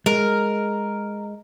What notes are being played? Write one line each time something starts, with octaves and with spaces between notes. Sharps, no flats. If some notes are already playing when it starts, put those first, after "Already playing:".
G#3 A#4